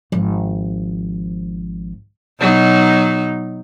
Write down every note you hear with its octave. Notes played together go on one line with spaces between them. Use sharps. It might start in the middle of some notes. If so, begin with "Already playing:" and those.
G#1 F3
B2 F#3 D#4